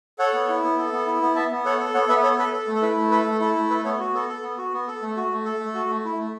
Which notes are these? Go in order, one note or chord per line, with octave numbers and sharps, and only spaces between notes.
A4 C#5 F#5
B3
E4
B3
A4
B3
E4
B3
B3 E5 A5
B3
A4 C#5 F#5
A4
B3 C#5 F#5
B3 B4 E5
A4 C#5
A4 B4
A4
A3
A4
E4 B4
A3
A4 B4
A3
E4 A4
A3
A4 B4
B3 A4 C#5
F#4
B3 A4
A4
B3
F#4
B3
A4
A3
F#4
A3
A4
A3
F#4
A3
E4
A3